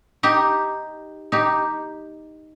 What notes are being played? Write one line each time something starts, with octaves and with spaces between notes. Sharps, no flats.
D#4 G4
D#4 G4